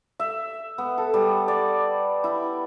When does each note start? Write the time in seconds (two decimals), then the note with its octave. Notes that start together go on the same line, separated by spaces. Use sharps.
0.20 E5
0.78 B3
0.98 A4
1.14 G3
1.48 D5
2.24 E4